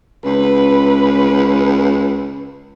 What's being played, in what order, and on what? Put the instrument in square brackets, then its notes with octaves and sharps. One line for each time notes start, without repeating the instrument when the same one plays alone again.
[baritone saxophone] C#2 [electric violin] B4